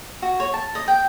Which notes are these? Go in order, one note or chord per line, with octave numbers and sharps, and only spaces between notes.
F#4
C#5
A5
D#5
G5